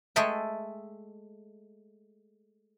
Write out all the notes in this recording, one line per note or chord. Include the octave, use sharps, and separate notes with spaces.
G#3 A3 G#4 A4 E5 G5